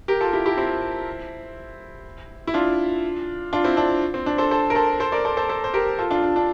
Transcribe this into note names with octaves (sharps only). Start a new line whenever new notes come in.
G4 A#4
F4 A4
E4 G4
E4 G4
C4 E4
E4
D4 F4
D4 F4
C4 E4
D4
C4
D4
A4 C5
A4 C5
A#4
A4 C5
A4 C5
A#4 D5
A4 C5
A4 C5
A4 C5
C5
G4 A#4
F4 A4
D4 F4
D4
D4